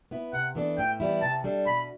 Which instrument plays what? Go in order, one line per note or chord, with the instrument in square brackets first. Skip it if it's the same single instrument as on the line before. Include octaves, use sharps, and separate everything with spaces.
[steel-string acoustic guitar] B3 E4 B4
[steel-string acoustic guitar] C3 [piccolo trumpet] F#5
[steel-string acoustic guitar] E3 B3 D4 A4
[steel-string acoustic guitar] A2 [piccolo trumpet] G5
[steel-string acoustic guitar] E3 G3 B3 E4
[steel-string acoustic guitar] C3 [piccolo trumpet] A5
[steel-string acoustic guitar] G3 D4 A4
[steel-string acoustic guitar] B2 [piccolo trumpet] B5